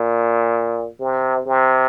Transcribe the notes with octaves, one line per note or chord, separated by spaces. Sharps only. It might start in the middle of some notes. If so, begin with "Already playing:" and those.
Already playing: A#2
C3
C3